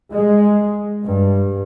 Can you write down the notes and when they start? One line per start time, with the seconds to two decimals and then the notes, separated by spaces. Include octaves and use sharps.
0.13 G#3
1.04 G2